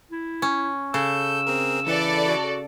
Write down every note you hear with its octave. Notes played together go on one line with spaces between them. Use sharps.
E4
C#4
C#3 A4 E6 G6
C4 G#4 A#4
E3 E4 A4 B4 D5
F#4